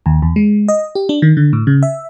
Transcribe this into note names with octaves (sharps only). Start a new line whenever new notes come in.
D#2
E2
G#3
D#5
G4
D4
D#3
D3
A2
C#3
E5